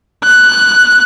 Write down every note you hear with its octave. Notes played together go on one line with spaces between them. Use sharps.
F#6